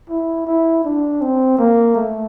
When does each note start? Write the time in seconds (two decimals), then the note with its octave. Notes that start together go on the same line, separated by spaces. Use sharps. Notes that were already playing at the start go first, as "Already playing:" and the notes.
0.10 E4
0.47 E4
0.84 D4
1.21 C4
1.59 A#3
1.96 A3